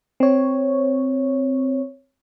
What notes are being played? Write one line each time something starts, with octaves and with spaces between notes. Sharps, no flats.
C4 C#5